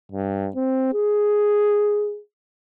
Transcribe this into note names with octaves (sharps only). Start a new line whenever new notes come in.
G2
C4
G#4